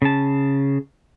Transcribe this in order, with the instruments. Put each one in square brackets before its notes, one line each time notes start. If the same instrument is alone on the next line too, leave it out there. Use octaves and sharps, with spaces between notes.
[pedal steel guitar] C#3 A5